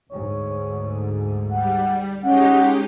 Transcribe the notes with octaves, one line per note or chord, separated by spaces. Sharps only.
D2 G#2 D3 C#5
G3 F#5
G#3 C#4 D#4 G4 F#5